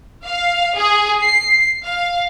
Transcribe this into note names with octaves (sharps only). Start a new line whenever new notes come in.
F5
G#4
C7
F5